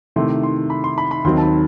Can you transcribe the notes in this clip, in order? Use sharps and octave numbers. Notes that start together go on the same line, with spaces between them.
C3 D#3 A3 E4 C6
C6
B5
C6
B5
B5
D#2 D#3 F#3 C4 D#4 C6
A5
B5